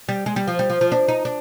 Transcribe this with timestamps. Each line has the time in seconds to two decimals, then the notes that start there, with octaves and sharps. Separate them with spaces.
0.09 G3
0.26 G#3
0.36 G3
0.47 F3
0.59 G3
0.70 F3
0.81 F3
0.92 D4
1.08 D#4
1.25 D4